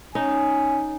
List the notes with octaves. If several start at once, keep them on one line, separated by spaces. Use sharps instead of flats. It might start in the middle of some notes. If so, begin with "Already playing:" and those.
C#4 D#4 C#5 G#5